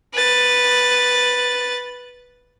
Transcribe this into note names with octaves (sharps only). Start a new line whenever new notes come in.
B4 A6